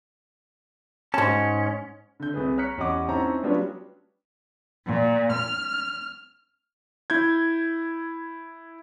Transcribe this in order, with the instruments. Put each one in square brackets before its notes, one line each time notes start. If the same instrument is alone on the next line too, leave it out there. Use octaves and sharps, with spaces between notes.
[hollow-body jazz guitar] G#2 A5 [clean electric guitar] C#4
[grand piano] D3 G6
C2 G#4 B4
C#5 A#5 F6 F#6 B6 C#7
E2 C#4 G4 D#5 F#5 D6
C4 C#4 D#4 E4 A5 A#5
F#3 G3 B3 C#4 D4 F4
[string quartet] A#2
F6
[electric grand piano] E4 G6 G#6